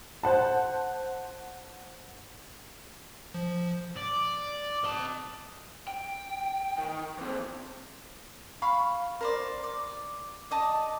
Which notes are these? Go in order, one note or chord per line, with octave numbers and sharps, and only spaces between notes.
C5 F#5 A5
F3
D5
D#5 A5
G5
D#3
E3 C4
F5 B5 C#6
A#4 C5 D5
D5
D5 D#5 A5